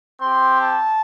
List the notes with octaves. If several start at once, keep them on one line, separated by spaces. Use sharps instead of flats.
C4 G4 C6
A5